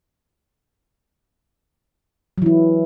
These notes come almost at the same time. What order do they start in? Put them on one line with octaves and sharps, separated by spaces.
F#3 E3 E4